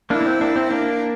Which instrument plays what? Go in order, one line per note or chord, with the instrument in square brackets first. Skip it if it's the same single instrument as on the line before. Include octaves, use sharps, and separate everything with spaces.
[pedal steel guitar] A#3 D4 [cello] E4
[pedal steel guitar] A#3
C4
A#3 D4
C4
[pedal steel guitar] A#3 [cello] D4